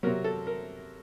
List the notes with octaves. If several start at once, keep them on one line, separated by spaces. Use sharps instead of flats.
C3 F#3 A#4
A4
A#4